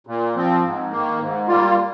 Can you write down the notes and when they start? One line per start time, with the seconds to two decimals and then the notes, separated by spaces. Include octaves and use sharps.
0.07 A#2
0.35 F3 C4
0.64 G#2
0.91 D#3 A#3
1.20 G#2
1.47 G3 A#3 F4